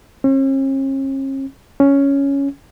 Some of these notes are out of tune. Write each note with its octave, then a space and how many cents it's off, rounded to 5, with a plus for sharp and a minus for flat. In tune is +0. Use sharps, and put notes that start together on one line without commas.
C#4 -45
C#4 +5